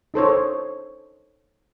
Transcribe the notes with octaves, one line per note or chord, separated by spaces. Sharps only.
D#4 A4 C5 C#5